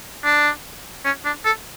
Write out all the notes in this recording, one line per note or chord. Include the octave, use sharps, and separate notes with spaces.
D4
C#4
D4
A4